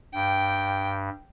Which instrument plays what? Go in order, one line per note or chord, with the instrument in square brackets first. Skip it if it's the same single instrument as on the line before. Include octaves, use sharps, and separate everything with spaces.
[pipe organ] G2 [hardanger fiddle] G5